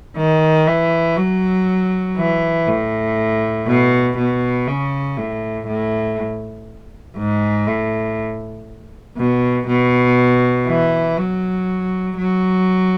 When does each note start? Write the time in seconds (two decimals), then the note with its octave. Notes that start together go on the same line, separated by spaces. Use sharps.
0.17 D#3
0.67 E3
1.17 F#3
2.17 E3
2.67 A2
3.67 B2
4.18 B2
4.67 C#3
5.17 A2
5.67 A2
7.18 G#2
7.67 A2
9.18 B2
9.68 B2
10.68 E3
11.18 F#3
12.17 F#3